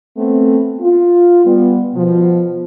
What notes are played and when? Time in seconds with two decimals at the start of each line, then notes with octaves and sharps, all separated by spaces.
0.17 A3 B3 C4
0.81 F4
1.46 G3 B3
1.95 B2 F3